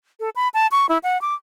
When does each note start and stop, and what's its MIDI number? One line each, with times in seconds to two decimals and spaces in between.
0.20 0.30 69
0.36 0.48 83
0.54 0.67 81
0.72 0.86 85
0.89 0.98 64
1.03 1.20 78
1.21 1.34 86